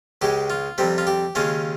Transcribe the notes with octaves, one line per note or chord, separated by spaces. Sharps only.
C#2 C#3 G#3 G4
F4
F2 C3 G3 C4
F4
G4
D#2 C#3 G#3 C#4 F4